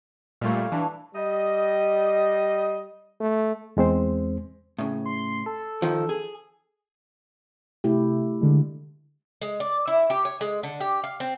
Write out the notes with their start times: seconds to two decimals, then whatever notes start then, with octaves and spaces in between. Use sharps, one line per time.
0.41 A#2 G3 A3 C#5 F5
0.72 E3 D4
1.15 G3 D#5
3.20 A3
3.77 E2 G#3 C4 C5
4.78 A2 C#3
5.06 C6
5.46 A4
5.82 D#3 F3
6.09 G#4
7.84 C3 A3 E4 G4
8.41 D3 G#3
9.42 G#3
9.60 D5
9.88 E4
10.10 G4
10.25 C#5
10.41 G#3
10.63 D3
10.80 G4
11.04 F5
11.20 C4